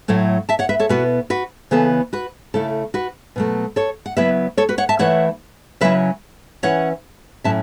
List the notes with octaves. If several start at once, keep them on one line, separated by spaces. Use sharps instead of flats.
A2 F#3 A3 E4
E5 A5
C#5 F#5
B4 E5
A4 C#5
B2 B3 E4 F#4 B4
F#4 B4
C#3 E3 B3 A4
F#4 B4
C#3 A3 E4 A4
F#4 B4
B2 F#3 A3
A4 C#5
F#5
C#3 F#3 B3 E4 B4 E5
A4 C#5
F#4 B4
C#5 F#5
E5 A5
E3 A3 E4 C#5 F#5
C#3 F#3 C#4 E4 B4 E5
E3 C#4 E4 C#5 F#5
A2 F#3 C#4 E4 E5 A5